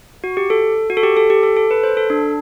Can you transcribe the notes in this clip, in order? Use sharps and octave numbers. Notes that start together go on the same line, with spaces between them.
F#4
G4
A4
F#4
A4
G4
A4
G4
A4
A4
B4
C5
A4
D4